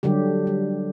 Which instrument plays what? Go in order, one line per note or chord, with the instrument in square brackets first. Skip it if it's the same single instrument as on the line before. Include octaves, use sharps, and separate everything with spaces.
[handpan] D3 F#3 G3 G4
G3